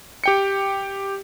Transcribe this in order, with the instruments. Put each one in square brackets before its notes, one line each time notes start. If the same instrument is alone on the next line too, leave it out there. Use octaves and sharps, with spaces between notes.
[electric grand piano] G4 G5 C#7